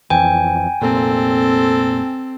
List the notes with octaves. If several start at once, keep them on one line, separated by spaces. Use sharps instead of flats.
F2 E3 G5 G#5
F1 A#2 C4 A4